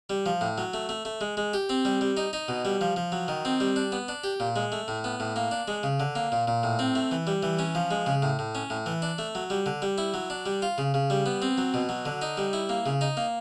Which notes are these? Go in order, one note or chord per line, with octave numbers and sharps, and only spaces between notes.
G3
F3
A2
F#3
A3
A3
A3
G#3
G#3
G4
C4
G3
G3
D#4
D#4
B2
G3
F3
F3
F#3
D#3
C4
G3
D4
B3
D4
G4
A#2
G#3
A3
A2
B3
A2
A#3
D4
G#3
C#3
D3
A#3
A#2
A#2
A2
C4
A3
E3
G3
E3
C#4
F3
G#3
C#3
A2
A2
C#4
A2
E3
D4
A3
F#3
G3
D3
G3
E4
F#3
D4
G3
F4
C#3
C#3
G3
B3
C4
F#3
B2
F#3
D3
D#4
G3
E4
A#3
C#3
D#4
A#3